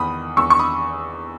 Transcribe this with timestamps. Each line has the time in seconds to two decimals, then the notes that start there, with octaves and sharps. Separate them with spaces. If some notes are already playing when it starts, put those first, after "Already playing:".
Already playing: E2 D#3 B5 D#6
0.37 E2 C#6 E6
0.50 C#6
0.59 B5 D#6